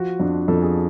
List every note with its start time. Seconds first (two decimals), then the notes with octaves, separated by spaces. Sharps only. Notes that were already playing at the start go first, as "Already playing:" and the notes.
Already playing: F3 F#4
0.20 F2 D4
0.48 F2 A4
0.62 G#4